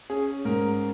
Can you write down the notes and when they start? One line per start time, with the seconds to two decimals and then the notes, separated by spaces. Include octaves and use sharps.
0.10 C#4 G#4
0.45 G#2 A#4